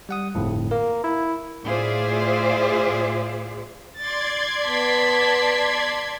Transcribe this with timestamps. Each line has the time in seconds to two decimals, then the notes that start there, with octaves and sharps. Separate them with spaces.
0.09 G3 F#5 D#6
0.35 G1 F2 A2
0.71 A#3 A#4
1.04 E4
1.65 A2 F4 G#4 C5 D5 E5
3.97 D5 C6 G#6 A6
4.66 B3 A5 B6